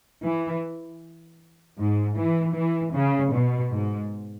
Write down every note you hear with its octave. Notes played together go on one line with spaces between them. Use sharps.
E3
G#2
E3
E3
C#3
B2
G#2